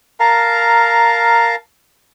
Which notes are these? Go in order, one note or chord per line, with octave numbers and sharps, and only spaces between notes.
A#4 F5 A5 A#5